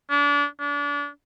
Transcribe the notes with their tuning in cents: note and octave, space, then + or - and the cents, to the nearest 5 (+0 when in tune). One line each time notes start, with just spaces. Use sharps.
D4 -30
D4 -30